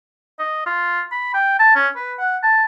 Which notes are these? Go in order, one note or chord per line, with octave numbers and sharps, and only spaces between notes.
D#5
F4
B5
G5
A5
C#4
B4
F#5
A5